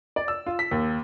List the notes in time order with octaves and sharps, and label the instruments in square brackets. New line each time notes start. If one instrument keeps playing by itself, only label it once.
[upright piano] D5
E6
F4
B6
D#2